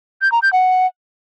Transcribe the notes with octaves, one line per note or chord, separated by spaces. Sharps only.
G6
A#5
G6
F#5